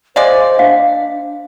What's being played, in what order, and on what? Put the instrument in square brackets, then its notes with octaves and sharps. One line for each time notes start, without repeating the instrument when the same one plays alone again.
[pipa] G#3 D5 [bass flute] C5 [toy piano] F5
[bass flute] D4 [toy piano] F5